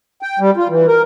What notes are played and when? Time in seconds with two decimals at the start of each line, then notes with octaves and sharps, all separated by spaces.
0.22 G5
0.39 G3
0.57 F4
0.69 E3
0.88 A#4